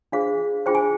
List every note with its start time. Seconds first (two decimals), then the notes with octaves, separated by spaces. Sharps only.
0.12 D4 F4 G#4 C5 F5
0.66 D4 F4 G#4 C5 G5
0.75 G#5